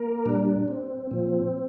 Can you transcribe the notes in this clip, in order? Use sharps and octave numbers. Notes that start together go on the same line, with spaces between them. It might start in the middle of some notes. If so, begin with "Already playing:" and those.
Already playing: A#3 A#4
A#2 G3 D4
C4
A#2 F3 C4